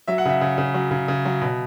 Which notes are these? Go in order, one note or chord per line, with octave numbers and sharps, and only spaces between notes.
F#3 E5
F#5
C#3 E5
C#3
C#3
F#3
C#3
C#3
F#3
B2